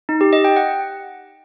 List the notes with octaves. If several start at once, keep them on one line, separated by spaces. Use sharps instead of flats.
D#4
G4
D#5
G5
F#5